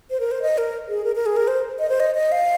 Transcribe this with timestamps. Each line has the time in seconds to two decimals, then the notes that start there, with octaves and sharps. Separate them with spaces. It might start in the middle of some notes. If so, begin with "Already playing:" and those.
0.10 C5
0.20 A#4
0.31 C5
0.42 D#5
0.58 A#4
0.88 G#4
1.04 A#4
1.15 A#4
1.26 G#4
1.37 A#4
1.48 C5
1.79 D#5
1.89 C5
2.00 D#5
2.15 D#5
2.32 F5